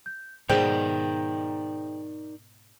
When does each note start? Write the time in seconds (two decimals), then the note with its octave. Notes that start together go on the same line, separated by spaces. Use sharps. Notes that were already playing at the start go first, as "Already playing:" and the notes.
0.06 G6
0.49 G#2 B2 D#4 G#4 A#4 C5 D5 G5